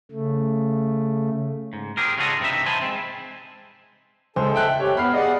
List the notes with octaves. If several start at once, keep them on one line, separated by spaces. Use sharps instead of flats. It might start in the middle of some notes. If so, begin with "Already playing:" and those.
C#3 A3
G#2
C4 G4 G#4 A#4
C#3 F4 F#4 G#4 A4 D#5
G2 C3 E3 D#4 E5
C5 E5 G#5 A5 B5
G#3 C4
C#2 A4 C5 G#5
E5 G5 F#6
G4 C#5 G5
B3 B5 F6 C7
G#4 D5 D#5 F5 F#5